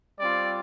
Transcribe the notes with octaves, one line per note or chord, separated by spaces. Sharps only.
G3 C4 F4 D5